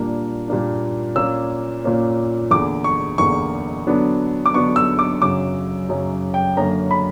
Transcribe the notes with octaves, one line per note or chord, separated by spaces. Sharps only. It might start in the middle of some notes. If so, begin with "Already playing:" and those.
Already playing: A#2 G3 A#3 D4
A#2 G3 A#3 D4
A#2 A#3 C#4 E6
A#2 A#3 C#4
E2 D3 A#3 D6
C#6
E2 D3 A#3 C#6
D3 F#3 B3 D4
D6
D3 F#3 B3 D4 C#6
E6
D6
F#2 C#3 F#3 D6
F#2 C#3 F#3
G5
F#2 D3 A#3 C#4 A#5
B5